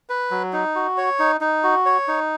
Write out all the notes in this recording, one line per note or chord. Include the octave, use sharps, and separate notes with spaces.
B4
F#3
D#4
F#4
C#5
D#4
D#4
F#4
C#5
D#4